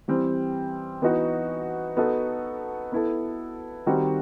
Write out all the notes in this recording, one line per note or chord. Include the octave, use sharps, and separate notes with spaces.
E3 G3 C4
E3 B3 D#4 F#4
B3 D#4 F#4 A4
B3 E4 A4
D#3 G3 C4 D#4 F#4